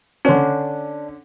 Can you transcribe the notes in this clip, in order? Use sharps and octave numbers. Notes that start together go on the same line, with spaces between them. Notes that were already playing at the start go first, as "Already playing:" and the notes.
D3 C#4 D4